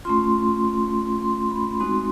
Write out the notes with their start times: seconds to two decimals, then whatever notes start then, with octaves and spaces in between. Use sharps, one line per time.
0.05 A3 C#4 F4 C6
1.22 C6
1.51 B5
1.80 G#3 C4 D#4 F#4 C6